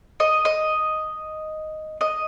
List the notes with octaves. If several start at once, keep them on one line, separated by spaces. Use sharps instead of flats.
D#5
D#5
D#5